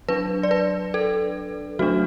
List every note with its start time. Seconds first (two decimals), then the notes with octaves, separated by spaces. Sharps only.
0.09 F#3 D4 B4
0.43 D5
0.51 B4
0.94 A4
1.79 F#3 A3 D4 F#4